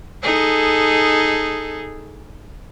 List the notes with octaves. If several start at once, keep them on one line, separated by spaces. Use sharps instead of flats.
D#4 G#4 A4